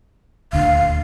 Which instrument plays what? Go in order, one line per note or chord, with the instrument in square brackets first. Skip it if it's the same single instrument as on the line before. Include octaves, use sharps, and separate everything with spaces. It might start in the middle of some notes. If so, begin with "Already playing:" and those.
[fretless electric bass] D#1 D2 D3 [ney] F5